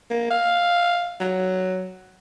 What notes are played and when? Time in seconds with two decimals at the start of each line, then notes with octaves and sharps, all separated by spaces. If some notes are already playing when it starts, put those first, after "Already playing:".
0.10 A#3
0.30 F5
1.20 F#3